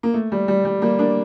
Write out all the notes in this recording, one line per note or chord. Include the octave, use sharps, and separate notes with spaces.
A#3
A3
G3
G3
G3
G3 A#3
A#3 D4